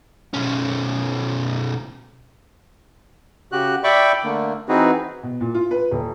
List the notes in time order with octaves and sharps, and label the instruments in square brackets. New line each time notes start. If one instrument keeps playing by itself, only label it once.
[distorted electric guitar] B1 C#4
[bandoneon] C#3 F#4 G4 F#6
D5 E5 G5 B5 C#6 D6
D3 A3 A#3
E3 C4 D#4 F#4 G#4 B4
[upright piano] B2
A#2
F4
B4
D#1